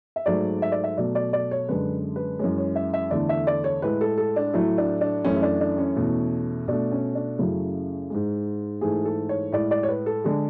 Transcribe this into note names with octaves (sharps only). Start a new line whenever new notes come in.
E5
G#2 F#3 A3 D5
E5
D5
E5
B2 F#3 A3 D5
D5
D5
C#5
F#2 D3 G#3 B4
B4
F#2 E3 G#3 C#5
C#5
E5
E5
E2 D3 A3 D5
E5
D5
C#5
A2 G#3 B4
A4
A4
D4
A2 F#3 A3 E4
D4
D4
F#2 E3 A3 C#4
E4
D4
D4
C#4
E2 B2 A3
B2 A3 D4
C#4
D4
F#2 C#3 F#3 A3 E4
G#2 G#3
G#2 E3 A3 G#4
A4
C#5
A2 G#3 D5
D5
C#5
B4
A4
D3 G#3 G#4